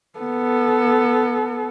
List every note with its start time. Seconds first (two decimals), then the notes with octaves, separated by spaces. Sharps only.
0.19 B3 A4